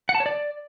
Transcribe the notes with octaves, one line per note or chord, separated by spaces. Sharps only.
F#5
A5
C#5
D5